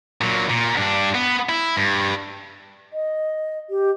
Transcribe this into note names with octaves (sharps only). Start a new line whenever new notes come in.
A#2 F#3
A#2
G2 D4
B3
E4
G2
D#5
G4